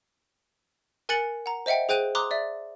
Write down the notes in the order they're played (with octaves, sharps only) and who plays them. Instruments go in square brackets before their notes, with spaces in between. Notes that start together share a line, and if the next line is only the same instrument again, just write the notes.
[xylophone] A#4 G#5 F#6 A6 C#7 F#7
F#5 A#5
C5 D#5 E5 F#5 G5
G#4 C5 G5 F#6 D#7
A#5 C6 D6 D#6 F#6
D5 E5